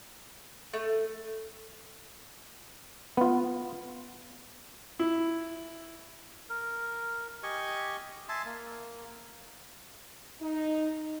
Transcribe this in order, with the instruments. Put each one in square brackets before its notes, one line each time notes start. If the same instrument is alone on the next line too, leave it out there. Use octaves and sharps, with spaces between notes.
[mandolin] A3
[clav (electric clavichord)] B3 F4
[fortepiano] E4
[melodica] A#4
G4 D#5 G#5 C#6
E5 G#5 A5 C6
A#3
[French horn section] D#4